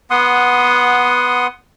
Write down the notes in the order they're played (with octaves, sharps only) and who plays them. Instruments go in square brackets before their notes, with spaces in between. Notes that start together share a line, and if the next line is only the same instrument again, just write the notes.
[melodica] B3 F#5 C6 D#6